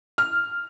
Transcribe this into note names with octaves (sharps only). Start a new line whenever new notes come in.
F6